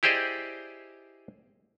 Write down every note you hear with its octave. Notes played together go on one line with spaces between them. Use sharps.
E4 G4 G#4 C5 D5 D#5